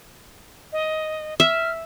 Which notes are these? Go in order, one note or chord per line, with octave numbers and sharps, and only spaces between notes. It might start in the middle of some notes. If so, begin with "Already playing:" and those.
D#5
E5 F6